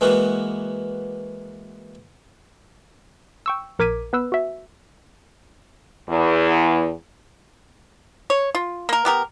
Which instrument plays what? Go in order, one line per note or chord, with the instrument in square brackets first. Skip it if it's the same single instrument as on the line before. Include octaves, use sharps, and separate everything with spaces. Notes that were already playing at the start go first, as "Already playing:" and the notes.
[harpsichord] E3 G#3 A#3 B3 F#4
[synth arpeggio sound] G5 C#6 E6
A#1 A#4 D6 G#6 B6 D#7
B3 B4 E6
F#4 E5
[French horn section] E2
[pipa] C#5
F4
A#3 A#4
B3 G4 A#4